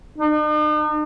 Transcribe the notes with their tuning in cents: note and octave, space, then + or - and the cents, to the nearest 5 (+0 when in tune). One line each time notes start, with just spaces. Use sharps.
D#4 -45